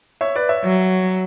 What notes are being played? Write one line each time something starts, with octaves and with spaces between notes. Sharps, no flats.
C#5 E5
B4 D5
C#5 E5
F#3